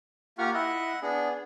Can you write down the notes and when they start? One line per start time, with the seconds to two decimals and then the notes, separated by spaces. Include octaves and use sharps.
0.38 A#3 F4 G4 F#5 C#6 F6
0.54 E4 D#5 E5 F#5
1.02 B3 D4 G#4